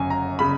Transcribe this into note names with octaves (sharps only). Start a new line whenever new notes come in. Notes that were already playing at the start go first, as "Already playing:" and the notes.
Already playing: G1 F#2 C#3 G#5
A#5
C#3 B5